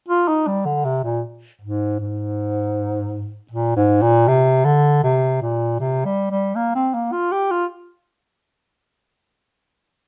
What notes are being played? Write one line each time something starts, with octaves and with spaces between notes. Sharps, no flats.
F4
D#4
G3
D3
C3
A#2
G#2
G#2
A#2
G#2
A#2
C3
D3
C3
A#2
C3
G3
G3
A#3
C4
A#3
F4
G4
F4